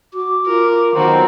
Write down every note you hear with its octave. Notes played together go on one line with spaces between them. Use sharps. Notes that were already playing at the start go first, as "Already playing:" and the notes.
F#4 D6
F4 A#4
B2 D#3 F#3 C4 F4 F#4 A#5